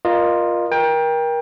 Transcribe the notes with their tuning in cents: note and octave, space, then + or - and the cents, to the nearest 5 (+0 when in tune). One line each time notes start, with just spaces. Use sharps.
F4 +0 A#4 +20 D#5 -25
A#4 +30 G5 +20